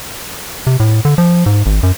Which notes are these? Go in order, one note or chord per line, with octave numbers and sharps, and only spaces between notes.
C3
A2
D3
F3
G#2
G#1
F#2